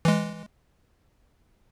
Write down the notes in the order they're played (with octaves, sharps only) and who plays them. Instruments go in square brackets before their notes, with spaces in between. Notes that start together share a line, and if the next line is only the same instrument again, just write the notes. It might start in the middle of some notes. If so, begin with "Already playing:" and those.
[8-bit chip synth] E3 G#3